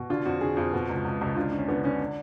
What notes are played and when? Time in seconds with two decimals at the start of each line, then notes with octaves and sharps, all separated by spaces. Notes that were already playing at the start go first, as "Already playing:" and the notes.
Already playing: B2
0.10 D3 F4
0.26 F2 F#4
0.41 D3 G#4
0.57 F2 F4
0.73 B2
0.89 C#2
1.05 C#2
1.21 C#2
1.36 D3 F4
1.52 D3
1.58 C#4
1.68 D3 B3
1.84 D3 C#4
1.99 D4